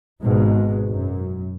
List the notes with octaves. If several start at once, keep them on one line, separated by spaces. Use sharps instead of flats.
G#1 G#2 B2 G#3
F#2